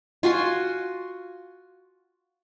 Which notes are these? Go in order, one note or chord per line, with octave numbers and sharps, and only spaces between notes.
F4 F#4 G#5 C6